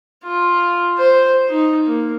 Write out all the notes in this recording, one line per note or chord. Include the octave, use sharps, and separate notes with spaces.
F4
C5
D#4
A#3